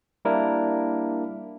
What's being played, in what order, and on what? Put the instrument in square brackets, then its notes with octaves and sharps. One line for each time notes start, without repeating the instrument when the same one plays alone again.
[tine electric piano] G3 A#3 D4 E4 A#4